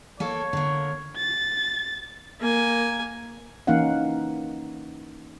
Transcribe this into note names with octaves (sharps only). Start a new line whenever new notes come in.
A#3 A4 C#5
D3 A#3
A6
A#3 G#5
E3 A#3 C#4 D#4 F5 F#5